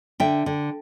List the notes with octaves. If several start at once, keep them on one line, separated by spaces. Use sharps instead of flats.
D3 E5 G5
D3